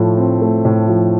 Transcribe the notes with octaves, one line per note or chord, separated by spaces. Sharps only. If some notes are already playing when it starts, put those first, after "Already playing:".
Already playing: A2 F3 A3
C4
A3
A2
F3